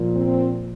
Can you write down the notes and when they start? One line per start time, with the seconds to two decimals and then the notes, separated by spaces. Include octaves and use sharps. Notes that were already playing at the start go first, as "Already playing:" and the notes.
Already playing: A#2 F3
0.16 C4